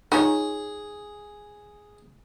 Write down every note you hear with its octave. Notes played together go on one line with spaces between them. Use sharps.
D#4 F4 G#4 C#5